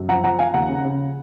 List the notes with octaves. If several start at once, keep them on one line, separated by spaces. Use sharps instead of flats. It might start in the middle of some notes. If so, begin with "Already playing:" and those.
Already playing: F#2
F3 F#5 A#5
F3 F#5 A#5
F3 F5 G#5
D#2 F#5 A#5
C#3
C#3